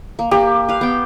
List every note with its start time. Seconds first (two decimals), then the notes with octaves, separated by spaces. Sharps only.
0.19 A#3
0.31 A#3 G4
0.68 B4 F5
0.81 B3 G5